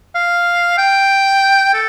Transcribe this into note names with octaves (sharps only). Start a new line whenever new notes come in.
F5
G5
A4